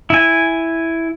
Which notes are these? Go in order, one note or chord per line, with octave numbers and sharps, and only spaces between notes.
E4 G#5